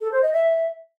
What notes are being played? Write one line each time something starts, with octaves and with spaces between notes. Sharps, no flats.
A4
C5
D#5
E5